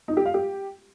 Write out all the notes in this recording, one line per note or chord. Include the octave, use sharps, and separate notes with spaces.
D#4
G4
F5
G4